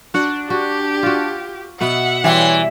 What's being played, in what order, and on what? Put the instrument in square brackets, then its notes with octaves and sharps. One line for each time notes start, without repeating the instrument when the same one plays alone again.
[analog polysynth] D4 [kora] F#4 F#5
[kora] F#4 [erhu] G4
[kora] F4 F#4
[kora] B2 B3 [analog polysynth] E5 [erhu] F#5
[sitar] E3 [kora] G3 [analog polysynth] C#5 G5 C6